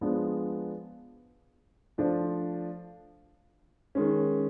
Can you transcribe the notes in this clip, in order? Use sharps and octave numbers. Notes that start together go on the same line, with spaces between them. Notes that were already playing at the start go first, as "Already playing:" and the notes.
F3 G#3 B3 D4
F3 A3 D4 F4
D#3 G#3 C#4